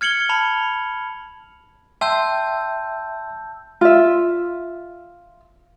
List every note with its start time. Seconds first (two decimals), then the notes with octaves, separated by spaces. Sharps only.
0.01 F6 G#6 C#7 F#7 G7
0.29 A5 B5 F7
2.01 E5 G5 A5 C6 E6 G6
3.81 F4 E5